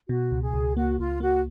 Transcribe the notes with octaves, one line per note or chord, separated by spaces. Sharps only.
B2 F#4
C#2
G#4
C#2
A#3 F#4
C#2 F4
A#3 F#4